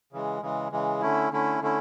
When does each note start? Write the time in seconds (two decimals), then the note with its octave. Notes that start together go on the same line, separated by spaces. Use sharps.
0.13 C#3 E3 G#3
0.42 C#3 E3 G#3
0.72 C#3 E3 G#3
1.01 D3 A3 C#4 E4
1.31 D3 A3 C#4 E4
1.61 D3 A3 C#4 E4